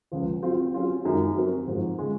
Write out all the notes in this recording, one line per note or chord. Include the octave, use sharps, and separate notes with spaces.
C#2 C#3 F3
F#3 C4 F4
F#3 C#4 F4 G#4
F#2 D#3 G#3 D#4
F#3 C4 F#4 A#4
G#2 F3 G#3
C#3 G#3